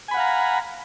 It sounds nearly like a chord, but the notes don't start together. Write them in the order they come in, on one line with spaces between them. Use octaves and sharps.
G#5 B5 F#5 F5 A#5